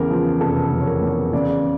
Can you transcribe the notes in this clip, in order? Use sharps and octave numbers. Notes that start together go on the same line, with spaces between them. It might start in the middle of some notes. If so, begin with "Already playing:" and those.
Already playing: E2 C#3 A#4
F3
F1 A4
C#3
C#5
A#4
E2
C#3 D5